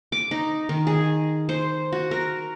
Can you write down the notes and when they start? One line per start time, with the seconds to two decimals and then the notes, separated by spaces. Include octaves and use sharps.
0.12 D6
0.31 D#4
0.69 D#3
0.87 G#4
1.49 C5
1.93 F#4
2.11 A#4